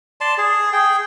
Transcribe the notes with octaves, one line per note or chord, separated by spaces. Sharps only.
D5 A5 C6
G#4
G#4 G5